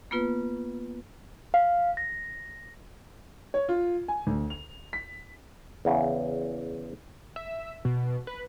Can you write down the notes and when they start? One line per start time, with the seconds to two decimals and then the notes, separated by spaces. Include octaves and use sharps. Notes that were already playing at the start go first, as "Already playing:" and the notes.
0.11 A#3 B3 F4 B4
1.54 F5
1.97 A#6
3.54 C#5
3.69 F4
4.08 G#5
4.27 D2
4.50 F7
4.93 B6
5.85 E2 C#3
7.36 E5
7.85 B2
8.27 B4